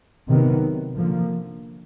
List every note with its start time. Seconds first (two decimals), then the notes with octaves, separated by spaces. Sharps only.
0.27 C3 D#3 F#3 B3
0.95 D3 F3 A#3